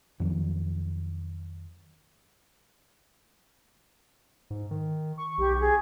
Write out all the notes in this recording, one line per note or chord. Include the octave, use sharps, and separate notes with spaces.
F2 D#3 F#3
G#2
D#3
C#6
B1 G4
G#4